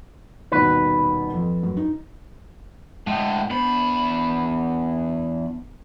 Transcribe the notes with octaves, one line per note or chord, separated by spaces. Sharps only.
D#1 B2 D#3 B4
F2
F#2
D#4
A2 D3 G#3 D#5 G5
E2 B3 D4 C5 B5